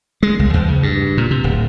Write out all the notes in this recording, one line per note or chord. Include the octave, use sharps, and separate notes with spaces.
G#3
C2
E2
C#3
G2
A#2
C3
D1